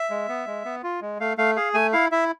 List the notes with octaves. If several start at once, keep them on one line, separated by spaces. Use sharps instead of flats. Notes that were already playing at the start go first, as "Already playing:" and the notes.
Already playing: E5
G#3
B3
G#3
B3
F4
G#3
A3 F5
A3 F5
G#4 F5
A3 G#5
E4 F5
E4 E5